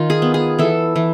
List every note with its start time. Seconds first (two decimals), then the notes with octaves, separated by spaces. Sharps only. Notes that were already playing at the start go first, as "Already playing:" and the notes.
Already playing: D#3 F4
0.10 G#4
0.22 B3
0.34 G#4
0.59 E3 A4
0.96 E3